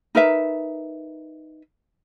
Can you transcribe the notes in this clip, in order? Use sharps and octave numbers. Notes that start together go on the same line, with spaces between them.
D#4 A#4 B4 E5